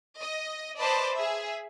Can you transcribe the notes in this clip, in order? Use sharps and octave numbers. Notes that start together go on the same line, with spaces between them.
D#5
B4 C5 D5 D#5 A5 B5
G#4 E5